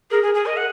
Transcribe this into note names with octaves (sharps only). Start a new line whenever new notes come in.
G#4 A#4
G#4
G#4
A#4 D#5
F#5